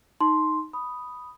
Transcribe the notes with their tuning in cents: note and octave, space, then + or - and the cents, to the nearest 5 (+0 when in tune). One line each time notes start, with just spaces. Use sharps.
D#4 +0 C6 +0
B5 +0 D#6 +0